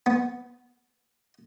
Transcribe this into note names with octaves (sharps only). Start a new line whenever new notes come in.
B3